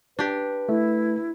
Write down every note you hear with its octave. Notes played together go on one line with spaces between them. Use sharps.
D4 G4 B4
A3 E4